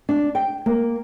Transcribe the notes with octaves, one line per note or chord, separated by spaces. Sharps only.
D4
G5
A#3